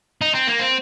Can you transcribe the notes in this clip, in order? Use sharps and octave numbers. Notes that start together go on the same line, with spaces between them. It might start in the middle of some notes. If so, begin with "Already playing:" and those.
D#4
C4
A#3
C4